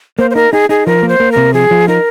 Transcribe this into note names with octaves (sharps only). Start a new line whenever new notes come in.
A#3 C5
C5
D#4 A#4
D#4 G#4
D#4 G#4
F3 A#4
A#3
C5
A#3
C3 A#4
F3 G#4
F3
D#4 A#4